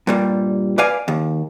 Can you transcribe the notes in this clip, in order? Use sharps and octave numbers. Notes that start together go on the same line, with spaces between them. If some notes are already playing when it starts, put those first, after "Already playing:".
G2 A#2 G3
B4 D5 F5 G#5
D#2